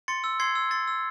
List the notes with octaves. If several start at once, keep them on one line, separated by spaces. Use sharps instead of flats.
C6 A6 C#7
E6
C6 G#6 C7
E6
C6 A6
E6